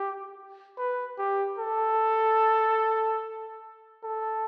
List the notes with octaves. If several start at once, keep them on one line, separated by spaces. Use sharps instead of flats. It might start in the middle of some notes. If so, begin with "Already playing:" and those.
Already playing: G4
B4
G4
A4
A4